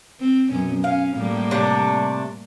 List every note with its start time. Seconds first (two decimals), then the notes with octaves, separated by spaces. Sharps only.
0.20 C4
0.50 F#2 B2 C#4
0.84 C#4 F5
1.15 A2 G3 A#3
1.51 C3 A3 D4